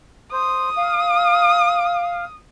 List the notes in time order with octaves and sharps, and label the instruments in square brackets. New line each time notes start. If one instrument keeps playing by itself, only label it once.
[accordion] C5 [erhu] D#6
[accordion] F5